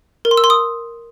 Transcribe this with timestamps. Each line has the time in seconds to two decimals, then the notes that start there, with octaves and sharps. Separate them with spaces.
0.25 A#4
0.31 C6
0.37 E6
0.44 C6
0.50 D#6